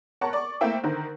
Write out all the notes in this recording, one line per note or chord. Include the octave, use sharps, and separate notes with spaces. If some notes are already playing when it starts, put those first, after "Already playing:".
A#4 C#5 F#5 A5 C#6
D5 C#6
A3 A#3 C4 E4 E5 G5
D3 D#3 A#4 C5